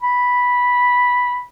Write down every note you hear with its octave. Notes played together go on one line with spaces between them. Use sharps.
B5